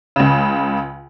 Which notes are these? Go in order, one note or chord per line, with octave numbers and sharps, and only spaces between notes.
C#2 C#3